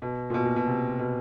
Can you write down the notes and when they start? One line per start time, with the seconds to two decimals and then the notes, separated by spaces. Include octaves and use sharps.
0.02 B2
0.30 A#2
0.34 B2
0.45 A#2
0.56 B2
0.67 C3
0.99 B2